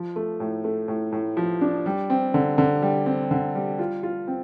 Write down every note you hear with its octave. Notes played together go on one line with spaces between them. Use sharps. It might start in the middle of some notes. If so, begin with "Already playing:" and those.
Already playing: F3
A3
A2
A3
A2
A2
F3
D4
G3
C4
D3
D3
G3
C4
D3
G3
F4
F4
C4